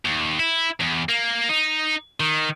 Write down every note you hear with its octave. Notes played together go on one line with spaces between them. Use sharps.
D#2
E4
E2
A#3
D#4
D#3